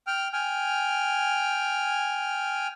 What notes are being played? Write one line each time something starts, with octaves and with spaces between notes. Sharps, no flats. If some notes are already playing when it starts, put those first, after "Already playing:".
G5 F6
G5 G#5 F6